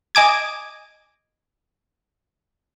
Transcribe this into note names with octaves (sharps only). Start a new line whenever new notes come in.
D#5 G#5 D6 G#6